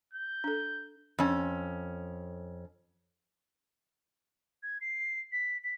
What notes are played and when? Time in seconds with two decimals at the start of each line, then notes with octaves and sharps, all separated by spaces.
0.13 G6
0.44 D4 A4
1.19 F2 C#4
4.63 G#6
4.81 C7
5.32 B6
5.64 B6